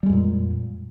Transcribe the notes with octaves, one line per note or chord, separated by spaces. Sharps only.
F2 A#2 G3 G#3